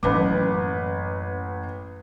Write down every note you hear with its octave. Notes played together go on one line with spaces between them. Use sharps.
A1 F#2 A#3 B4 D6